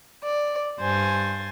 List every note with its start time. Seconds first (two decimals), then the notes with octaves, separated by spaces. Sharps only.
0.22 D5
0.79 G2 C5 G#5 A6